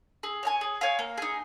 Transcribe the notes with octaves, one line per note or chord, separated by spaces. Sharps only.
G#4
C#5 F5 G#5
G#4
C#5 F5 G#5
A#3
D#4 G#4